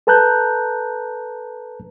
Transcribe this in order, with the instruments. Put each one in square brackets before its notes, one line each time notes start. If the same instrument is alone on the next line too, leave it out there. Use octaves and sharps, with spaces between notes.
[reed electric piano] A4 B4 A5 A#5 F#6 G6